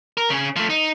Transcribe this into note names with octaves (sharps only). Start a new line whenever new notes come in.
A#4
C#3 G#4
F3 A3
D#4